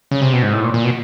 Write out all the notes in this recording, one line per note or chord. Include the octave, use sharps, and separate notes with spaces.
C#3
C3
B2
G#2
A2
A#2
A#2
B2